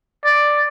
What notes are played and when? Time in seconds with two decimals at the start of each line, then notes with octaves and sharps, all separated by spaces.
0.25 D5